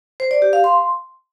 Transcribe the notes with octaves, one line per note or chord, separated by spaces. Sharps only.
C5
D5
G4
F5
C6